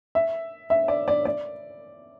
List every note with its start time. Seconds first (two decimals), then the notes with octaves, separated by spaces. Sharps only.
0.15 E5
0.70 E5
0.88 D5
1.08 D5
1.25 D5